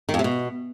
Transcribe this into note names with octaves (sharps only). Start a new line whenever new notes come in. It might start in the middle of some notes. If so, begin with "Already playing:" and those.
D#3
F2
C3
B2